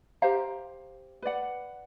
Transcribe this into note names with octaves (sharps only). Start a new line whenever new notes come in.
G4 C5 F5 A#5
B4 D5 F#5